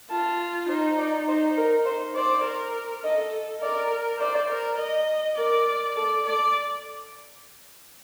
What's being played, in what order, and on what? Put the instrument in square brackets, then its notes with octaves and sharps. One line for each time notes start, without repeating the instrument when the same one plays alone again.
[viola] F4 [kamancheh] A5
[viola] D#4 [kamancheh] C5
[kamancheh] D5
[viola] D#4 [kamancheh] C5
[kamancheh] A#4
C5
[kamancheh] C5 [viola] D5
[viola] A#4
[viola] A4 [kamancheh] D#5
[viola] A#4 [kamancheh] D5
[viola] C5 [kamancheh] D5
[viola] A#4
D#5
[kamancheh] A#4 [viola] D5
[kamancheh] A4 [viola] D5
[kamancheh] A4 [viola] D5